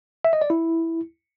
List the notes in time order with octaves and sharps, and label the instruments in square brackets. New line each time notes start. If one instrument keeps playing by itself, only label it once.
[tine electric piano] E5
D#5
D5
E4